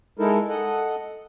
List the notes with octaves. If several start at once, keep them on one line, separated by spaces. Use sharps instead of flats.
G#3 D#4 E4 A4 A#4
A4 D#5 F#5